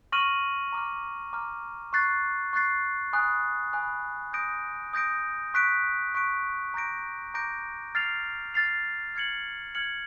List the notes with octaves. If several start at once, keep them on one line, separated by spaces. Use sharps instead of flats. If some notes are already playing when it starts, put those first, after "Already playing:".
C#6 F6 A#6 D#7 F#7
A#5 D6 F6
A#5 D6 F6
C#6 F#6 A6 C7
C#6 F#6 A6 C7
G#5 B5 D#6 F#6
G#5 B5 D#6 F#6
D#6 G6 A#6 D7
D#6 G6 A#6 D7
C#6 F#6 B6 D7
C#6 F#6 B6 D7
A#5 D6 G6 A#6 D7
A#5 D6 G6 A#6 D7
F6 A6 C7 F7
F6 A6 C7 F7
F6 G#6 C#7 F#7
F6 G#6 C#7 F#7